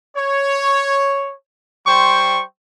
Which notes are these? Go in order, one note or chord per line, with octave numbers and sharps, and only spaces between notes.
C#5
G3 C5 G5 C6 C#6